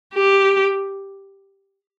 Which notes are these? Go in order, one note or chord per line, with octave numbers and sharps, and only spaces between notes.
G4